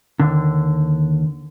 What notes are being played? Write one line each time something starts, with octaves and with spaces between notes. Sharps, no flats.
D#2 D3